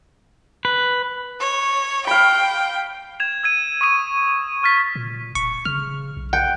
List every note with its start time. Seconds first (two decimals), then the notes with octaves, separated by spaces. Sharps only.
0.65 B4
1.40 C#5
2.07 F5 G5 B5
3.20 G#6 E7 F7
3.43 E6 G#6 D#7
3.81 C#6 D#6 D#7
4.63 C#6 F6 A6 B6
4.95 A#2
5.35 E1 C#6
5.65 C#3 F6
6.17 B1
6.33 F#5 G5